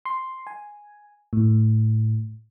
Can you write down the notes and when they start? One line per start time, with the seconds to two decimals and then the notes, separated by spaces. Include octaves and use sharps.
0.05 C6
0.47 G#5
1.33 A2